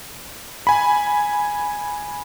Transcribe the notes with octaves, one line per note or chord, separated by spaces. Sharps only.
G#5 B5